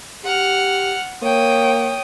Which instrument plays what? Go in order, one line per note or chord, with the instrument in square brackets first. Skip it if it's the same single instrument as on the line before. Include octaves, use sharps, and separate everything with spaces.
[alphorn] G4 [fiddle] F#5 F6
[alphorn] A#3 [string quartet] C#5 G5 [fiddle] D#6